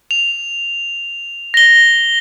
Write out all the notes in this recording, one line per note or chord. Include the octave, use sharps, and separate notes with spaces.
F7
A#6 G7